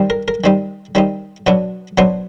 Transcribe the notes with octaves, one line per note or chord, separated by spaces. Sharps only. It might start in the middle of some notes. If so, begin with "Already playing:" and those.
Already playing: D#3 G3 C4 D#4
A#4
A#4
D#3 G3 C4 D#4
D#3 G3 C4 D#4
B2 F#3 B3 D4
B2 F#3 B3 D4 C5